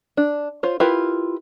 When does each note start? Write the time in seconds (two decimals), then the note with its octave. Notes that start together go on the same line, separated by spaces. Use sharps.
0.17 D4
0.63 F4 C5 C#5
0.80 E4 F4 G4 A#4 B4